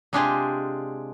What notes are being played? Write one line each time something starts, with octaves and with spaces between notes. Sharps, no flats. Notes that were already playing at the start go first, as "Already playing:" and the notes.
C3 G#3 D4 F4 G4 G#4